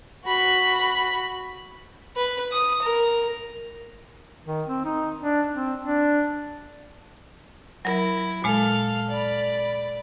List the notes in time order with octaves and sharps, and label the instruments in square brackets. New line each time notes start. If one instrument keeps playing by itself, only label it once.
[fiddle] F#4 B5
B4
D#6
A#4
[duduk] D#3
C4
D#4
D4
C4
D4
[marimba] F#3 A#4 [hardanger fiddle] E4
[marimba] A#2 G#3 [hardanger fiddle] A4 F5
[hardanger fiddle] D5 B5